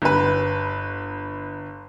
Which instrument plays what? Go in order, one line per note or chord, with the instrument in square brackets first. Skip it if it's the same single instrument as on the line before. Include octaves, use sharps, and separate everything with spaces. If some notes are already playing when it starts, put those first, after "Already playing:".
[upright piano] G1 B4